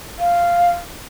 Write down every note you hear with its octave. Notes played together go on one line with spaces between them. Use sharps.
F5